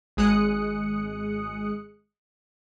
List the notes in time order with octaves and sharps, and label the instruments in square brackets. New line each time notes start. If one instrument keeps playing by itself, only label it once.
[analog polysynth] G#1 G#3 D#6 F#6 C#7